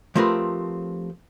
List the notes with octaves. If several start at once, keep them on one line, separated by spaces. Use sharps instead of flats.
F3 A3 C4 G4 A#4 B4